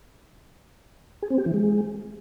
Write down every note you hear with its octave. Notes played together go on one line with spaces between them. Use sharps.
G#4
C4
G4
E3
G#3